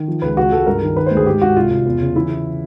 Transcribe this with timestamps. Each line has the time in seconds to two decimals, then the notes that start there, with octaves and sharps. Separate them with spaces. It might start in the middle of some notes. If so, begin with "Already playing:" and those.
Already playing: D#3
0.08 F3
0.22 C#2 B4
0.37 C#2 F#4
0.52 C#2 A4
0.67 G2 A#4
0.82 D#3
0.96 D#3 B4
1.07 C5
1.11 D2
1.17 G#4
1.26 G#2 G4
1.42 G#2 F#4
1.56 C2 F4
1.71 C2
1.85 E2
2.00 C#3
2.15 E3 E4
2.30 E3